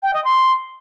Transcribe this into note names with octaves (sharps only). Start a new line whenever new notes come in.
G5
D#5
C6